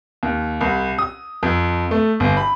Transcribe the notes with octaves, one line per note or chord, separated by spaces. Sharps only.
D#2
C2
D#6
F2
A3
G1
B5